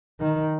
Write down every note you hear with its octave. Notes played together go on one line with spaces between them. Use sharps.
D#3